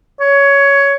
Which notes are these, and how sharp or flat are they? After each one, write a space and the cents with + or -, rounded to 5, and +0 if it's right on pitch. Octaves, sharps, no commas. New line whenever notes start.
C#5 +15